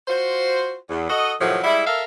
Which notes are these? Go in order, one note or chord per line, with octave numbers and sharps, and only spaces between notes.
F4 F#4 C5
E2
F#4 A4 D#5
A2 C3 D#3 F3 F#3
G3 G#3 E4
A4 A#4 E5 F5